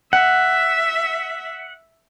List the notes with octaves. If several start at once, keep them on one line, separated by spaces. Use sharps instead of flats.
E5 F#5